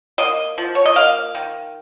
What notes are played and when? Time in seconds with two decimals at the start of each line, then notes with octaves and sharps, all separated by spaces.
0.18 A#3 D#5
0.58 F3
0.75 C#5
0.86 D#5
0.96 A#3 F5
1.35 D#3